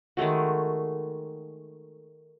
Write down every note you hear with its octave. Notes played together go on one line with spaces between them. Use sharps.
D#3 G#3 A3 F#4